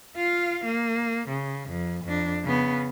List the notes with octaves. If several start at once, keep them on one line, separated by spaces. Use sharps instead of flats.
F4 F5
A#3
C#3
F2
F2 D4
C#3 B3